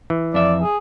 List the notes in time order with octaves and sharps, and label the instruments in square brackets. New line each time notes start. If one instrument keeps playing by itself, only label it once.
[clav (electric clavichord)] E3
[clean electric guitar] F2 E5 [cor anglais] D5
[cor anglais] G#4